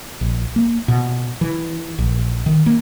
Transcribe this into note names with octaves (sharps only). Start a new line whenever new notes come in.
A#1
A#3
B2
E3
A#1
D#3
A#3